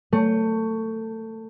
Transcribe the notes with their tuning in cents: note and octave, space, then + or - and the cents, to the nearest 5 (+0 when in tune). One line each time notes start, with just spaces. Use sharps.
A3 +20